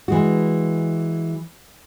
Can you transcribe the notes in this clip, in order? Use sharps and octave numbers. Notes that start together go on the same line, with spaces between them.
E3 G#3 F#4